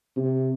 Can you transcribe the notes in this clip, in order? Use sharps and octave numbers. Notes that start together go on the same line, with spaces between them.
C3